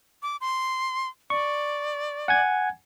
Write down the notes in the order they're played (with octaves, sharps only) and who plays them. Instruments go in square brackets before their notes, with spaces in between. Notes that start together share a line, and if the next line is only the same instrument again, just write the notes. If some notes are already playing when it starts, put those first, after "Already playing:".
[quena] D6
C6
[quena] D5 [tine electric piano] C#6
[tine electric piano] F#5 G#5 G#6